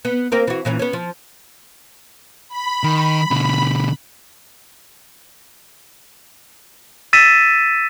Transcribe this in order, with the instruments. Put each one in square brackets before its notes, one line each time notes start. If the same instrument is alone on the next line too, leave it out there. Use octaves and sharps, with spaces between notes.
[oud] B3
A#3 C4 A#4
E3 F#4
A#2 E3 C#4
B3 C#4
F3
[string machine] B5
[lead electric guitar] D#3
B2 D3
[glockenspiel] E6 A6 B6 D#7 E7